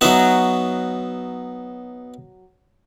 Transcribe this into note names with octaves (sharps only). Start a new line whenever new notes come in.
F#3 B3 D#4 F#4 E5